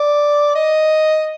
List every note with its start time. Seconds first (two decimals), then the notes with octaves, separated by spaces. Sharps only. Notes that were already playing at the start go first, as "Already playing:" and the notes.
Already playing: D5
0.55 D#5